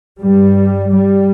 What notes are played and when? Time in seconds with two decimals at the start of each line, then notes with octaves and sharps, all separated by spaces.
0.21 G2 G3
0.91 G3